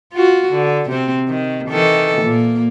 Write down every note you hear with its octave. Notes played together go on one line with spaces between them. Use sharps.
F4 F#4
D3
C3 C4
D#3
D#3 E3 A4
A#2 A#3